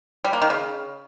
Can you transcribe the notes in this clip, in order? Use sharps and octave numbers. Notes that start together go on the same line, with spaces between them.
G3
A#3
D#3
C#3